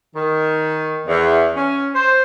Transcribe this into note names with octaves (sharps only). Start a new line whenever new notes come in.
D#3
E2
C#4
C5